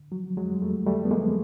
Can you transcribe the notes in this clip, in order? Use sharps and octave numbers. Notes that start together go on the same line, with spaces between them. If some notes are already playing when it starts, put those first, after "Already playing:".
Already playing: D3
F3 F#3
F2 F#3 G#3
F2 G3 A3
D3 G3 A3
B3
F3 G#3 A#3